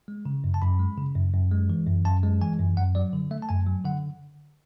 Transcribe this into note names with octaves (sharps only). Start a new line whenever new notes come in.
G#3
C#3
F#2
A5
F#2 B5
G#3
C#3
F#2
F#2
G#3
E3
F#2
F#2 A5
G#3
E3 G#5
F#2
F#2 F#5
F#3 D5
D3
A3 E5
A5
F#2 G#5
F#3
D3 F#5